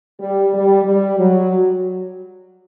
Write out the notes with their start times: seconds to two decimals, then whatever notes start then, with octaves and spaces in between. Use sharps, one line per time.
0.20 G3
0.53 G3
0.86 G3
1.20 F#3